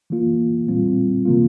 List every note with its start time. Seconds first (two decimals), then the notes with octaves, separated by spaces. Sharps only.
0.10 E3 A#3 F4
0.68 A#2 G3 C4 F4
1.25 C3 E3 A#3 F4